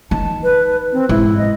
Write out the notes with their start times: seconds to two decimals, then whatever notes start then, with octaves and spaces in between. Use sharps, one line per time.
0.11 D#3 A5
0.43 B4
0.93 C4
1.09 G#2 E4
1.37 D#5